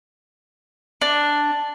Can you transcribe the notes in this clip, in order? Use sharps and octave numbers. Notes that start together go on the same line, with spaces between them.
D4